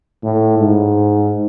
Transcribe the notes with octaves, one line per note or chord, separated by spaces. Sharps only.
A2
G#2